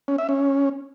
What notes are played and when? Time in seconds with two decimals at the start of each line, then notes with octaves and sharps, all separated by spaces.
0.08 C#4
0.18 E5
0.29 C#4